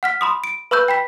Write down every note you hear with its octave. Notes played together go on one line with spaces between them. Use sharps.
F#5 F6 B6
B5 C6 D#6
D7
B4 B5 C#6 E6 F#6 G6
G5 B5 B6